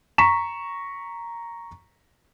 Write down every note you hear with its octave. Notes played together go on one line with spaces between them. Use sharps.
A#5 C#6 B6 E7